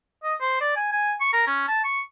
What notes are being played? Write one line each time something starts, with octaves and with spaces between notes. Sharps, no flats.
D#5
C5
D5
G#5
G#5
C#6
A#4
C#4
A5
C#6